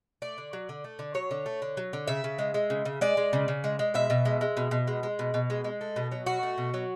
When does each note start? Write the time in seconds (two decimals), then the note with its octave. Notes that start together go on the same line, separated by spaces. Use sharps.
0.22 A3 D5
0.38 D3
0.53 F#3
0.69 D3
0.84 A3
0.99 D3
1.15 F#3 C#5
1.31 D3
1.46 A3
1.62 D3
1.77 F#3
1.93 D3
2.07 C#3 E5
2.24 C#3
2.39 G#3
2.54 G#3
2.70 C#3
2.85 C#3
3.01 G#3 D5
3.17 G#3
3.33 C#3
3.48 C#3
3.64 G#3
3.79 G#3
3.94 B2 E5
4.10 B2
4.25 G#3
4.41 G#3
4.57 B2
4.71 B2
4.87 G#3
5.03 G#3
5.19 B2
5.34 B2
5.50 G#3
5.64 G#3
5.81 A3
5.96 B2
6.12 F#3
6.26 B2 F#4
6.43 A3
6.58 B2
6.74 F#3